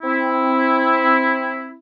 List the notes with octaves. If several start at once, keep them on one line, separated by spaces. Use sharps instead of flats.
C4 E4